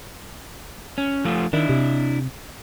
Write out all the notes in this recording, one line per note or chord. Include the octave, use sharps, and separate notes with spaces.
C#4
F3 A3 F4
D#3 D4 E4
C3